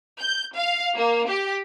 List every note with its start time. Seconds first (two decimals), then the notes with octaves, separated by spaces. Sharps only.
0.20 G6
0.55 F5
0.95 A#3
1.28 G4